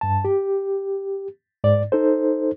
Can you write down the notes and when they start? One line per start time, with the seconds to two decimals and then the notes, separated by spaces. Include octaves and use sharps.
0.01 G2 A5
0.25 G4
1.64 G#2 D5
1.92 D#4 A4 C5